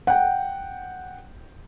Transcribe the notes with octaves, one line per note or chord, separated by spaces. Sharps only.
F#5 G5